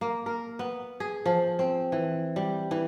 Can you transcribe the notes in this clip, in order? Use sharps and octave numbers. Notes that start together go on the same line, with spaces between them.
A#3
A#4
B3
G#4
F3
C4
E3
G3
E3